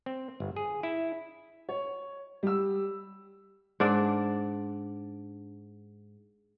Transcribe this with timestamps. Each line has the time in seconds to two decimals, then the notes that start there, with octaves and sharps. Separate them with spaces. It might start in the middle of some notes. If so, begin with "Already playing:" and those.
0.06 C4
0.40 G1
0.56 G#4
0.83 E4
1.69 C#5
2.43 G3 E6
3.80 G#2 D4 D5